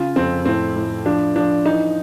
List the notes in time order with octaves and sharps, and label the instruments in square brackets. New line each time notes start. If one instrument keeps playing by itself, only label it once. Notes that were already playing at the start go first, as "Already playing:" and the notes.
Already playing: [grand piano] C#3 F4
F2 C4
A2 C4
A2
F3 D4
F3 D4
E3 D#4